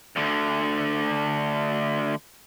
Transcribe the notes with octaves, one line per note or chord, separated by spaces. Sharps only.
D2 D3